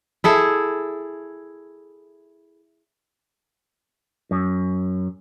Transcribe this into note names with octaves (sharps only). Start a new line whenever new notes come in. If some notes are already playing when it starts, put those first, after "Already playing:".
E4 G#4 A4
F#2